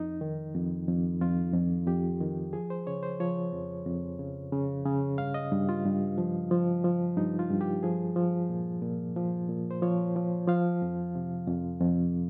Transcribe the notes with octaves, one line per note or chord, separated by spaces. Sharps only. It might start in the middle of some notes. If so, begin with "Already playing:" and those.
Already playing: F2 D#4
D#3
F2
F2
F2 F4
F2
F2 G4
D#3
F3 G#4
C5
C#3 C#5
C5
F3 C#5
F2
F2
C#3
C#3
C#3
G2 F5
D#5
G2
F4
G2
F3
F3
F3
G2 D#4
F4
G2
G4
F3 G#4
F3
A#2
A#2
F3
A#2
C5
F3 C#5
F3
F3 F5
F2
C3
F2
F2